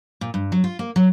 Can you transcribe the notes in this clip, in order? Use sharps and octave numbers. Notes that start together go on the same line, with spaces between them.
A#2
G2
F#3
F4
A#3
F#3